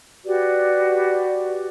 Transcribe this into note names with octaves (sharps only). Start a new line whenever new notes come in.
F#4 G4 B4 D5